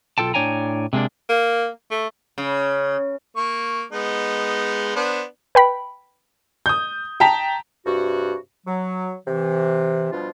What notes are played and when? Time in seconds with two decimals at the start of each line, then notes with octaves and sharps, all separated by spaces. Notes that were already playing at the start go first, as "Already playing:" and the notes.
0.18 B1 F4 A4 G5 A5
0.34 A2 D4 C#5 G5 G#5 A#5
0.93 C3 G#3 A#3 D4
1.29 A#3
1.91 A3
2.38 C#3
3.36 A#3 C#6
3.92 G#3 B3 D#4
4.96 B3 D4 C5
5.55 B4 G5 B5
6.66 D#6 G6
7.20 G5 A5 A#5 B6 F7
7.85 G2 C3 F#4
8.66 F#3
9.26 C3 E3
10.12 B2 F3 G3 D4 F4